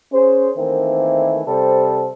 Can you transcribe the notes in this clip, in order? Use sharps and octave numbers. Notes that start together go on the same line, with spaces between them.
C#4 G#4 C5
D#3 E3 A3 A#3 C4
C3 G3 A4 C5